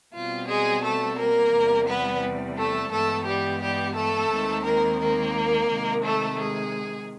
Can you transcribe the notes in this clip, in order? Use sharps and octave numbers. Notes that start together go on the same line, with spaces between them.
B2 G3 C4 F4
G#3 G#4
A3 A4
A#3 A#4
E2 C3 E3 G3
B3 B4
A3 A4
G2 E3 G#3 A3 B3 A4
G3 G4
G3 G4
A3 A4
D#2 D#3 G#3 C4
A#3 A#4
A#3 A#4
C3 D#3 G#3
A3 A4
G#3 G#4